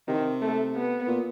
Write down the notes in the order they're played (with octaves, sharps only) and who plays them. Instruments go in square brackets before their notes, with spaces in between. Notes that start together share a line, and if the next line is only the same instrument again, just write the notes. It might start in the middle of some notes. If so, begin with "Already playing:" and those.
[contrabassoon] C3 [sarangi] D#3
[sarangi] A3
B3
[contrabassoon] A#2